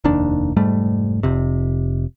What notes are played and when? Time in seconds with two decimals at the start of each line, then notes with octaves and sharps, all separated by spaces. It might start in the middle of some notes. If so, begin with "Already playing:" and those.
0.04 F1 D#2 D#3 D4
0.56 F1 G#2 G3 A3
1.23 F1 C3